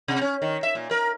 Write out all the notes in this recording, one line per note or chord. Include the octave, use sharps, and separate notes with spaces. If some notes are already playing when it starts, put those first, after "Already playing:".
C3
C#4
D#3
E5
A#2
A#4